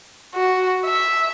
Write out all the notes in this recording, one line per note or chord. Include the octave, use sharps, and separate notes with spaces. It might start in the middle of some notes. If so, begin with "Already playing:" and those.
F#4
E5